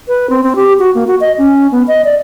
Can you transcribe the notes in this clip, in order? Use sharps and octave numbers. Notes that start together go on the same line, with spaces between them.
B4
C4
C4
G4
F#4
A#3
F#4
D#5
C#4
B3
D#5
D5